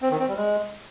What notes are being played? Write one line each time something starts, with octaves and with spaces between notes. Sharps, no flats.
C4
D#3
C4
G3
G#3